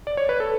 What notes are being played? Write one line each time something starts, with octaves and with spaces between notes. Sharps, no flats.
D5
C#5
B4
A4